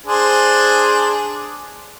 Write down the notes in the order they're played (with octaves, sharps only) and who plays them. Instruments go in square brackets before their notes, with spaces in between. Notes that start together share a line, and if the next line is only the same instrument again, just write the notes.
[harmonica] D4 G#4 C5